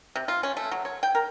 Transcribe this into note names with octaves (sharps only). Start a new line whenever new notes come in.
C3
F4
C#4
A3
F#3
C#5
G5
A#4